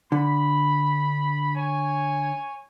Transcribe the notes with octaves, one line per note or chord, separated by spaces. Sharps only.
D3 B5
C#5 G#5